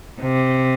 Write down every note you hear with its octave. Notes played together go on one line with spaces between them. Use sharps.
C3